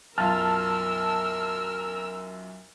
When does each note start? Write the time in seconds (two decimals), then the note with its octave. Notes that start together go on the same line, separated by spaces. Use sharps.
0.18 B1 F#2 F4 A#4 A5 E6 F6